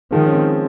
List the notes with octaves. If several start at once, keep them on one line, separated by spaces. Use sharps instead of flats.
D#3 F3 G#3
C#4
G#3 C4